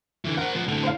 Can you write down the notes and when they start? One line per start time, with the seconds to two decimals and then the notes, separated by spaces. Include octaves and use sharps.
0.25 D3 E3
0.37 A#4 C5 F#5
0.55 B1 F3
0.68 A2 D3 F7
0.83 C5 F5